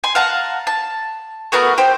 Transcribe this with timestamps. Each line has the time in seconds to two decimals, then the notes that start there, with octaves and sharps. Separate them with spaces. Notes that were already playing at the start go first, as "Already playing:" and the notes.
0.04 G#5 C6
0.15 F5 F#5 A5 A#5
0.67 A5
1.52 A3 B3 F#4 A#4
1.78 G4 C5